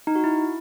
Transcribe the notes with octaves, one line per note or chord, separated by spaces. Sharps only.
D#4
F#4
E4